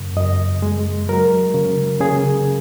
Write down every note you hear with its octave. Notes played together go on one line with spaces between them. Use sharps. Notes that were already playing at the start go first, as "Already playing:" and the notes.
Already playing: F#2 C#3
F#2 D#5
G#3
F#3 A#4
C#3
C#3 G#4